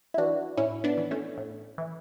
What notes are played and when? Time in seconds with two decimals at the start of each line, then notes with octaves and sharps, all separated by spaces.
0.14 E4
0.18 E3 D4 F#4
0.57 A2 C#4 E4
0.84 B3 D4
0.97 E3
1.11 A3 C#4
1.38 A2
1.78 E3